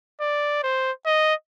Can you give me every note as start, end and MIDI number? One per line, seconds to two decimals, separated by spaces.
0.21 0.59 74
0.63 0.91 72
1.06 1.34 75